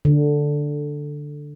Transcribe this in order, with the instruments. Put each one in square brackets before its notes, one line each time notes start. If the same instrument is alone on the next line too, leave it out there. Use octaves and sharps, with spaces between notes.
[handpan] D3